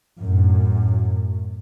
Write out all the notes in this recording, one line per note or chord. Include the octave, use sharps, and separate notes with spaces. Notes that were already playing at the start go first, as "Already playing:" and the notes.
F#2 A2